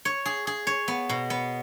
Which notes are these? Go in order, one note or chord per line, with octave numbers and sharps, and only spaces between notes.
C#5
G#4
G#4
C#5
B3
B2
B3